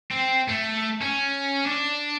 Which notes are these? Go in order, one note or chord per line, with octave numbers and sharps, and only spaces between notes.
C4
A3
C#4
D4